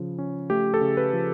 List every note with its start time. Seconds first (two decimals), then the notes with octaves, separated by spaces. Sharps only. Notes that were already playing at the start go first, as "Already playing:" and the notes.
Already playing: C#3 F3
0.19 C#4
0.50 A3 G4
0.74 A4
0.81 C#3
0.97 B4
1.13 F3